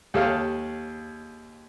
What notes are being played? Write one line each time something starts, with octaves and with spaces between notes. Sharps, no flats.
D#2 G#4 A4 C#5 F5 F6